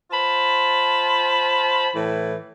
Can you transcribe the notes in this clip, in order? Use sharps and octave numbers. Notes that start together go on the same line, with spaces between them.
F4 C5 A5 B5
A2 E3